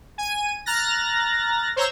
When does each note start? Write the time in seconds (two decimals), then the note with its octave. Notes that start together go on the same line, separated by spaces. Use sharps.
0.18 G#5 D#7
0.66 A#5 F6 F#6 A6 A#6
1.76 C5 C#5 A#5 E6